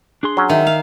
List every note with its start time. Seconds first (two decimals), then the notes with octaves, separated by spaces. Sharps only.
0.23 D4 G#4 C6
0.37 F#3 C#4
0.50 D#3 E5
0.67 F5